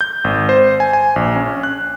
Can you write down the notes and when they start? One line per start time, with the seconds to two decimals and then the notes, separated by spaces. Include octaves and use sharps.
0.01 G6
0.24 G#1
0.49 C5
0.80 G#5
0.93 G#5
1.16 A#1
1.36 C#4
1.63 F#6